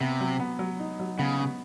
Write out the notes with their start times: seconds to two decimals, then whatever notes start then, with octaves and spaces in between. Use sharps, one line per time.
0.01 C3 B3
0.20 F#3
0.40 B3
0.59 F#3
0.80 D#4
1.00 F#3
1.18 C#3 B3
1.39 B3